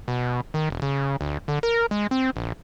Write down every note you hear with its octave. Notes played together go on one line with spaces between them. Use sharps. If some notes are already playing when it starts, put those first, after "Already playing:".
B2
D#3
E1
C#3
D2
D3
A#4
G#3
C4
A#1